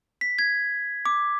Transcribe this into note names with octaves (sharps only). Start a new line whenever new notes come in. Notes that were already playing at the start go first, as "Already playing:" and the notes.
B6
G#6
D6